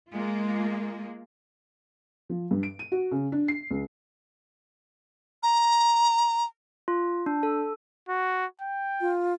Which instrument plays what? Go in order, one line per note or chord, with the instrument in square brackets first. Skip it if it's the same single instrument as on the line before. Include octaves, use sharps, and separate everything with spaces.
[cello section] G#3 A#3 F4
[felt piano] F3
G2
D7
D#7
F#4
C#3
D4
C7
C#2
[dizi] A#5
[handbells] F4
D4
A4
[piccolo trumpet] F#4
G5
[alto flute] F4